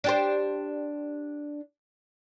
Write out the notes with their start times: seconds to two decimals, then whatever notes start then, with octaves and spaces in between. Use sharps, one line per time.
0.04 D4 G4 C5